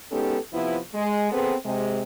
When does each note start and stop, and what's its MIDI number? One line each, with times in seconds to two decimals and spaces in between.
0.11 0.37 56
0.11 0.37 59
0.11 0.37 61
0.11 0.37 63
0.11 0.37 67
0.11 0.37 69
0.53 0.78 48
0.53 0.78 53
0.53 0.78 59
0.53 0.78 64
0.94 1.29 56
1.32 1.54 59
1.32 1.54 60
1.32 1.54 68
1.32 1.54 69
1.32 1.54 71
1.32 1.54 72
1.66 2.02 48
1.66 2.02 56